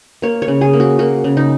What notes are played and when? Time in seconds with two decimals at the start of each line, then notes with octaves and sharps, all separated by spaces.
0.22 A#3 C#5
0.42 C#5
0.48 C#3
0.61 G#4
0.73 A#3
0.80 F#4
0.99 A#3 F#4
1.24 C#3
1.37 D#4